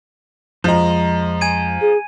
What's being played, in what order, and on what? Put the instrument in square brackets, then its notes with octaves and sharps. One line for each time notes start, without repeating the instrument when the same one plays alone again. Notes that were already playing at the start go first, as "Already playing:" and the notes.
[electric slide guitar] F2 G#3 D#5 [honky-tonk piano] F3 A#5
[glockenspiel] G#5 G#6 D#7
[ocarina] G#4